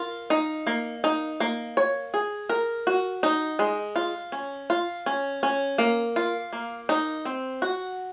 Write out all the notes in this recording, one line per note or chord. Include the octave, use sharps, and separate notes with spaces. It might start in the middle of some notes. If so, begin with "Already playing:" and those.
Already playing: F4 A#4
D#4
A#3
D#4
A#3
C#5
G#4
A#4
F#4
D#4
G#3
F4
C#4
F4
C#4
C#4
A#3
F4
A#3
D#4
C4
F#4